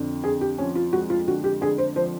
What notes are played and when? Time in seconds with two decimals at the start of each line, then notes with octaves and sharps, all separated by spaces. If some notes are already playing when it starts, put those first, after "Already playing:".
Already playing: F2 D3
0.24 D3 G#4
0.41 G4
0.58 F3 C#4
0.75 F4
0.93 G#3 F#4
1.10 F4
1.27 D3 F#4
1.44 G4
1.61 D3 G#4
1.78 C5
1.96 F3 C5